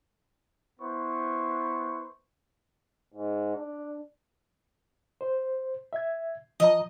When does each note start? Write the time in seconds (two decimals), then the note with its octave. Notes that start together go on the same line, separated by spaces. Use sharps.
0.79 B3 E4 B4 C5 C#6
3.14 G#2
3.56 D4
5.21 C5
5.93 E5 G#6
6.60 F3 D#5 A#5